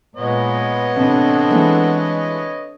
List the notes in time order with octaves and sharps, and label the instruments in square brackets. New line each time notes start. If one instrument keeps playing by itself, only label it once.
[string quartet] A#2 G#3 [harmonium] B3 [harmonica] B4 C#5 D#5
[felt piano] A1 C3 [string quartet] C4 D4 A4
[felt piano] E3 G#3 A3